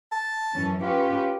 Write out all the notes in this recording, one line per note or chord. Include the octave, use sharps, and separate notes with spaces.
A5
F#2 E3 C#4
C#4 F4 G4 B4